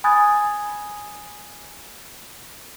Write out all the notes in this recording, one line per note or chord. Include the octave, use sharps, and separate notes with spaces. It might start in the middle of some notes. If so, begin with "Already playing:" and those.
G#5 B5 D#6 F#6 G#6 A6